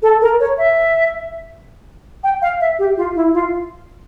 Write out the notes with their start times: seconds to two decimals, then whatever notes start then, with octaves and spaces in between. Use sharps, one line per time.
0.02 A4
0.21 A#4
0.39 C#5
0.58 E5
2.23 G5
2.42 F5
2.60 E5
2.79 G4
2.97 F4
3.15 E4
3.33 F4